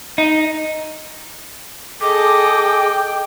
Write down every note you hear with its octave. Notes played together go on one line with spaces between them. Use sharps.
D#4
G#4 A4 D#5 G5 D6